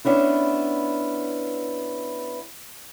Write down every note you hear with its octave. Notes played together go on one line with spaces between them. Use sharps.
B3 C#4 D4 E4